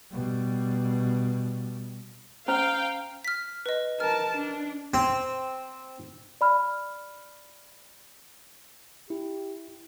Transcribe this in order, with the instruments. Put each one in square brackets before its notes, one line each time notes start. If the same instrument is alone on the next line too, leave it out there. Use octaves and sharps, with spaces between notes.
[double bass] B2 G3
[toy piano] C#4 C5 [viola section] F5 G5 [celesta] A#5 F6 F7
[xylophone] F6 B6
B4 D#5
[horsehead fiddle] A#4 A5 [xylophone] F6
[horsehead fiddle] D4
[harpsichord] C4
[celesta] D5 B5 F6
[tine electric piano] E4 [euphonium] G4